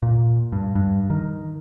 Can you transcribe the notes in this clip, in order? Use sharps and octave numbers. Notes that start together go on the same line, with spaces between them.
A#2
G2
G2
D#3